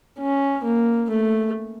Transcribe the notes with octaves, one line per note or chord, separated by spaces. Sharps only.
C#4
A#3
A3